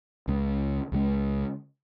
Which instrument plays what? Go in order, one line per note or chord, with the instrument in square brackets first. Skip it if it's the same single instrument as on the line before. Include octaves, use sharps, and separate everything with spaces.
[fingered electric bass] C#2 C#3 G#3
C#2 C#3 G#3